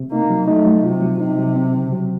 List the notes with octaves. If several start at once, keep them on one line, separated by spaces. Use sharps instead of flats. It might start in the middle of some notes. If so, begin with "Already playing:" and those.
Already playing: C3
A#3 D#4
F#3
A3 D#4
F#3
C3 F4
F#3
C3 D#4
F#3
C4
C#3
F#3